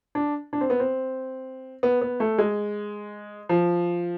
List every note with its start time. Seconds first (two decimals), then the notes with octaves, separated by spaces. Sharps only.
0.15 D4
0.53 D4
0.61 C4
0.70 B3
0.80 C4
1.83 B3
2.02 B3
2.20 A3
2.38 G#3
3.49 F3